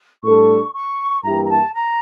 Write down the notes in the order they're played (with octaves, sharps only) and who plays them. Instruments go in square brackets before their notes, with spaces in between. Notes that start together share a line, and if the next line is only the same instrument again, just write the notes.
[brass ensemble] A2 G3 D4 A4 [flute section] C#6
[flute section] C#6
[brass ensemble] G2 E3 A#3 E4 G4 [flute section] A#5
[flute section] A#5
A5
A#5